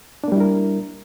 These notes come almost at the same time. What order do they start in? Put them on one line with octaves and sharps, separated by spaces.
D4 A#3 G3 E4 A#4